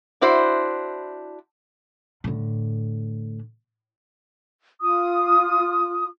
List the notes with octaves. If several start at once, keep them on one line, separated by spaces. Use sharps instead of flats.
D4 E4 F#4 C5
A2 D3
F4 D#6